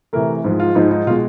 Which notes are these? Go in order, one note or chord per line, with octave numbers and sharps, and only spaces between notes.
C3 E3 A3 A#4
G#2 F3 G#3
F4
G#2 F3 G#3 D#4
D#4
B2 G#3 F4